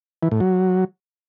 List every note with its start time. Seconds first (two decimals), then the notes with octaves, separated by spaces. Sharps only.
0.23 E3
0.31 A2
0.40 F#3